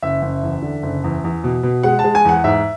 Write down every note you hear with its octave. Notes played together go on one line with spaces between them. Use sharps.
F#1 E5
F#1
E2
D3
F#1
E2
E2
B2
B2
G#3 F#5
A5
G#3
G#5
E2 F#5
G#2 E5